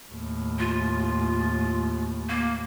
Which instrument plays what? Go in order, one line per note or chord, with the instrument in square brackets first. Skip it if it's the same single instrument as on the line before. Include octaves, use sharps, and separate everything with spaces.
[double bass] D#2 A2
[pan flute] F4
A#3